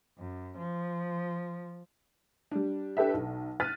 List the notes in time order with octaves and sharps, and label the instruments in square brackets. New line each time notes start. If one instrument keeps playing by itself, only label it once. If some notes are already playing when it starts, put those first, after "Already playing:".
[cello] F#2
F3
[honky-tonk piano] G3 D4
D4 G4 A4 B4 E5
B1
F6 F#6 A6 B6 D#7